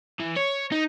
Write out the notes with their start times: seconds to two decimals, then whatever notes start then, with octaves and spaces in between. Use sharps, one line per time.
0.20 E3
0.37 C#5
0.72 D#4